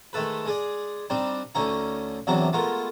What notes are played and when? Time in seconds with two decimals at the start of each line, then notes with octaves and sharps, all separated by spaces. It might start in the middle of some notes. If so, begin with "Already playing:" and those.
0.13 D#3 G#3 A3 A4 B4
0.45 G#3 G#4 D5
1.10 G3 C4 D4 D#4
1.55 D2 A3 C#4 D#4 A#5
2.27 E2 C3 F#3 D4 A#5
2.53 G#3 A3 B3 F4 A#4